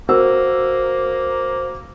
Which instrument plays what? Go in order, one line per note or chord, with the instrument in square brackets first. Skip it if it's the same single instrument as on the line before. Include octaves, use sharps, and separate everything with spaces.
[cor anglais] A#3 [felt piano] F#4 A#4 E6 [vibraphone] C5